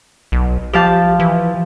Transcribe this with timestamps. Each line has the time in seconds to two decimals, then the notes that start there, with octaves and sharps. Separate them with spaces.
0.32 B1
0.73 F3 G4 F5 A5
1.20 E3